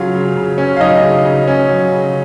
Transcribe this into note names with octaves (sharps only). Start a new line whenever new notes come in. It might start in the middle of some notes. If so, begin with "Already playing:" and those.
Already playing: C#3 F#3 C#4 F4 F5
C#3
C#3
C#4
F5
F#3 D#4 D#5
C#3
C#3
C#4
F#3
C#3